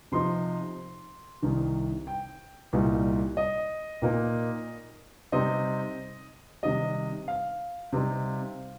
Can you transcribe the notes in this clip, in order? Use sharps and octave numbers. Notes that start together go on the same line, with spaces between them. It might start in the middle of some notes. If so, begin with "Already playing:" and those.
C3 F3 D#4 C6
C2 C3 D#3
G5
C2 A#2 G3 D#4
D#5
A#2 A#3 D#4
C3 G3 C4 D#4 D#5
C3 D#3 G3 D#5
F5
C3 G3 C4 D#4